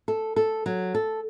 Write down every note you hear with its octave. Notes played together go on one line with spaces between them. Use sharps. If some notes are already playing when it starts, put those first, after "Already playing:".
A4
A4
F#3
A4